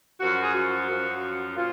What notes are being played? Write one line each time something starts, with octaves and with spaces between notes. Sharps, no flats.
F#2 F3 F#4
G#4
F#4
F#2 F3
A#2 F4